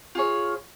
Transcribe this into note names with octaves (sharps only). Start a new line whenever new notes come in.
F4 G#4 C#5